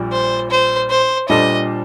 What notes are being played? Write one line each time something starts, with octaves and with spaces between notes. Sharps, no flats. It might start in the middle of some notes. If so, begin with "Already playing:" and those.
Already playing: A#1 A#2 G3
C5
C5
C5
A#2 G3 D4 A4 C5 D#5